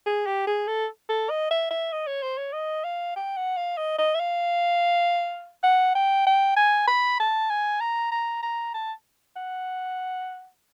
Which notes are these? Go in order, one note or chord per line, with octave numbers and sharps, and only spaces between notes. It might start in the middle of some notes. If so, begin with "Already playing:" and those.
G#4
G4
G#4
A4
A4
D#5
E5
E5
D#5
C#5
C5
C#5
D#5
F5
G5
F#5
F5
D#5
D#5
E5
F5
F#5
G5
G5
G#5
B5
A5
G#5
A#5
A#5
A#5
A5
F#5